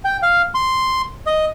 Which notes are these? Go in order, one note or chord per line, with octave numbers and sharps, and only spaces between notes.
G5
F5
C6
D#5